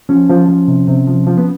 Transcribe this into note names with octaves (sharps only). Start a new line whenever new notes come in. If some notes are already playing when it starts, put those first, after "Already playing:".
F3 C#4
F3
F3
C3
C3
F3
F3
B3